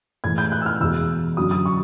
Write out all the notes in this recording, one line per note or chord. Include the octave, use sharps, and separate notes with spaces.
A2 E3 G#3 G#6
G6
F#6
E6
F6
E2 B2 G#3 E6
F#2 D3 F#3 D#6
D#6
C#6